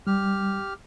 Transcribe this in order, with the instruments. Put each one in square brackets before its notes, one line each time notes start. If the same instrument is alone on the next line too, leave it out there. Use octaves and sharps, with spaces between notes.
[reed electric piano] G3 [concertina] G4 F6